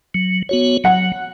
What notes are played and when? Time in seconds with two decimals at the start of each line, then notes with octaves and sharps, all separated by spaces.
0.14 F#3
0.49 B3 F#4 C#5
0.84 F#3 F#5